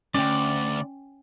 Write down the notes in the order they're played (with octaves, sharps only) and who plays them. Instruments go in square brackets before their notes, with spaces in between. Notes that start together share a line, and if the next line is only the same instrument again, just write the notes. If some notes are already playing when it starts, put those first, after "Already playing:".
[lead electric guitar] D2 G2 [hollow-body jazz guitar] C#4 G5 [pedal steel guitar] D5